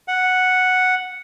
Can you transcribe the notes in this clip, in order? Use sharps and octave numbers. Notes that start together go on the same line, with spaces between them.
F#5